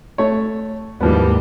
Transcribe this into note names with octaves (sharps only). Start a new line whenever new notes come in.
A3 C#5
D#2 G#2 E3 F3 G3 B3